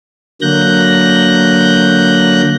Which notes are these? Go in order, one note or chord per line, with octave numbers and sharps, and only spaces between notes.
D3 F#3 A#3 F#6 G6 A#6